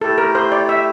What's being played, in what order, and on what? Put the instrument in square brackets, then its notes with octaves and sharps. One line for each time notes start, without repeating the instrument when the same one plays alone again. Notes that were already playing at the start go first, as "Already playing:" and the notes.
[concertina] A3 E4 G4 [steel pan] A4
[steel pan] A#4
C5
D5
E5